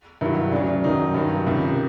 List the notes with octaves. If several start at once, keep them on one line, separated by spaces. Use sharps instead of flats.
G2 D#3 F#3 E4
D2 C#3 F#3 D4
F#2 D#3 F#3 D#4
G2 D#3 F#3
C#2 C3 D#3